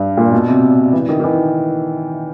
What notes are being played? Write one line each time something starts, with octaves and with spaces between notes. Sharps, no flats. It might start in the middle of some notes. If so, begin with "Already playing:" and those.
Already playing: G2
A#2
B2
C3
E3
D#3
D#3
E3